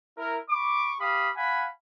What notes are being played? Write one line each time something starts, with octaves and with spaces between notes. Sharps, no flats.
E4 A#4
B5 C#6 D6
G4 F5 B5 D#6
F5 F#5 G#5 B5